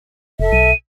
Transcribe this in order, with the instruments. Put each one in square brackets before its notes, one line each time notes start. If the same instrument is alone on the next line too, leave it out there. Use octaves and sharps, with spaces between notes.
[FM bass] F1 [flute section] A4 E5
[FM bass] B1 [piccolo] D#7